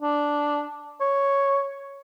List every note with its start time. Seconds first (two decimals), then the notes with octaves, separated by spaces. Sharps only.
0.02 D4
1.01 C#5